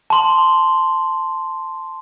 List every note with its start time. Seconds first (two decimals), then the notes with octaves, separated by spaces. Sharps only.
0.10 A5 C6